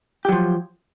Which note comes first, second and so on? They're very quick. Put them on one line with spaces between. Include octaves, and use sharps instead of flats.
G4 F#3 F3